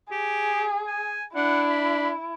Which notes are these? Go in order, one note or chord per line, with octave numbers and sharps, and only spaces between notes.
G4 G#4
G#5
D4 E4 F#5
B5